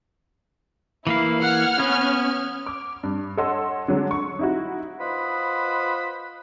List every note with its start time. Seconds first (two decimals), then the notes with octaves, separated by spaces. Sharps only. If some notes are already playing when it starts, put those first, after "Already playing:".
1.07 E3 A#3 E4 F5
1.42 F#5 F6 G#6
1.80 B3 C#4
2.66 D6
3.03 G2
3.37 A4 C#5 D#5 F#5 C6 E6
3.88 D3 F#3 G#3
4.11 C#6
4.39 D#4 E4 F#4
5.00 F4 B4 C5 D#5 F#5 B5